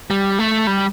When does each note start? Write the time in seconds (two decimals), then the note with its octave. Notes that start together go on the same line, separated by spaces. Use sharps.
0.10 G3
0.39 A3
0.67 G3